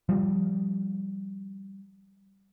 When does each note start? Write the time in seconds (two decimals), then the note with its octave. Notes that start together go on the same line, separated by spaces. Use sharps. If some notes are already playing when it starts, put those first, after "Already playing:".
0.09 F3 G3